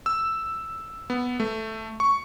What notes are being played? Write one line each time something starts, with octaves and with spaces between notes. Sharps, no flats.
E6
B3
A3
C#6